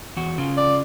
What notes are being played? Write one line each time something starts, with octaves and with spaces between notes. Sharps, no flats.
E2 F#4
C#3 F4
D5